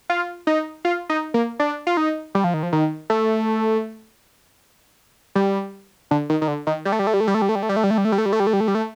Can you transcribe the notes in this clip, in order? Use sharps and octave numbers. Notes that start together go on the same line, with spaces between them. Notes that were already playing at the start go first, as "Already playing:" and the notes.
F4
D#4
F4
D#4
A#3
D4
F4
D#4
G3
F3
D#3
F3
D#3
A3
G3
D3
D#3
D#3
D3
D#3
G3
A3
G3
A3
G3
A3
G3
A3
G3
A3
G3
A3
G3
A3
G3
A3
G3
A3
G3
A3
G3
A3
G3
A3
G3
A3
G3
A3